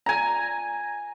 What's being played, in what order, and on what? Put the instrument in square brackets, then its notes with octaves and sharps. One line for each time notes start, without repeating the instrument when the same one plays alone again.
[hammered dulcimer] G#5 A#5